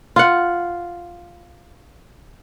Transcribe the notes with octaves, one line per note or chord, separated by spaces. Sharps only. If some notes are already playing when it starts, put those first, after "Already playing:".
F4 F#5